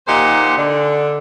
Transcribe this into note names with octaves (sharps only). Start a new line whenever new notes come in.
D#2 A#2 D#4 G4 C5 F#5
D3